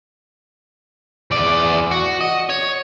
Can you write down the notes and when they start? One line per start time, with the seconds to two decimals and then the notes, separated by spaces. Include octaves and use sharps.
1.31 E2 D5
1.91 F#4
2.21 D#5
2.50 C#5